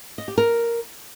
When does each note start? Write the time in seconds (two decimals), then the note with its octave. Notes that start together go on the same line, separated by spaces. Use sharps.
0.18 D#5
0.28 G4
0.38 A#4